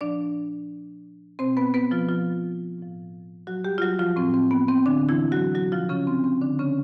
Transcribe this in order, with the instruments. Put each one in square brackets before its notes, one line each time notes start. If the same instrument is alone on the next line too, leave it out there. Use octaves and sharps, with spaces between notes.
[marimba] A#2 F3 D4 D5
B2 C4 C5
B3 B4
B3 B4
F3 F4
F3 F4
A2 F3
F#3 F#4
G3 G4
F4
F#3 F#4
F3 F4
A2 F3 C4
C4
B3
C4
D3 D4
E3 E4
F#3 F#4
B2 F#3 F#4
F3 F4
C#3 C#4
C4
C4
D3 D4
C#3 C#4